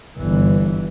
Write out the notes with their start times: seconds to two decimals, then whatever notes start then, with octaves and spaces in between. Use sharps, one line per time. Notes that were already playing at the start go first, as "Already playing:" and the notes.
0.18 G1 E3